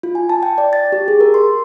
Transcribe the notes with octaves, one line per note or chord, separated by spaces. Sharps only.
F4
G#5
A5
G5
D5
A6
G4
G#4
A#4
C6